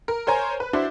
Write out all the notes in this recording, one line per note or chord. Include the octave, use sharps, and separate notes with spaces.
A#4
A#4 C5 C#5 G#5 A#5
B4
D4 E4 F#4 C5